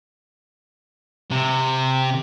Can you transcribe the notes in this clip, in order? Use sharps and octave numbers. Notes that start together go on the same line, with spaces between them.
C3